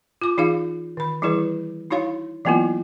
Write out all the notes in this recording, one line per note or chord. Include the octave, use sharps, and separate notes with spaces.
F4 D6
E3 D#4 F4 G#4 F5
D#3 B5
E3 G3 E4 G#4 B4
D#4 E4 F#4 C#5 F5 C6
E3 F#3 A#3 B3 E4 F4